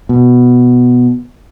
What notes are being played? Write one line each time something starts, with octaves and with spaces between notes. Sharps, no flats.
B2